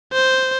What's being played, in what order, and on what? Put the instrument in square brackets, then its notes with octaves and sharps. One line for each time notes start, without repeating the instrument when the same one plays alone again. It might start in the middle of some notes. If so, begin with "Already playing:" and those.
[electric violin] C5